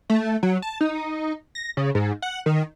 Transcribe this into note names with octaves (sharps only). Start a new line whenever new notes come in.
A3
F#3
A5
D#4
A#6
C#3
G#2
F#5
D#3